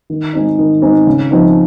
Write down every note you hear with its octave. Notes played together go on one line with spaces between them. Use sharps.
D#3
G#3 C4 D#4
D#3
G#3 C4 D#4
C#3
F3 C4 D#4